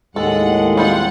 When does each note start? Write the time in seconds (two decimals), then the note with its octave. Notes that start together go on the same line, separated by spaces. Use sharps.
0.16 D#2 A2 G#3 A4 F#5
0.77 G3 C4 F4 F#5